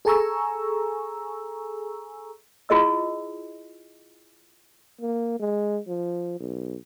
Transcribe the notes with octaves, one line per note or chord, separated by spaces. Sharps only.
G#4 A4 G#5 A#5 C#6 E6
E4 F4 G#4 D#5 E6
A#3
G#3
F3
B1